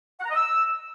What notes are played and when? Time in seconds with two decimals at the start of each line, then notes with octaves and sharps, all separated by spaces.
0.20 F#5
0.25 A#5
0.30 D#5
0.35 E6